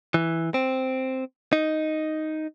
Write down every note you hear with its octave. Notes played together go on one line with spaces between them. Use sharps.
E3
C4
D#4